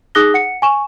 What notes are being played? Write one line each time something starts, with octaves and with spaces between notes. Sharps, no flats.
D#4 G#4 D#6 F#6 A#6 G7
F#5 C#7
G#5 C#6 E7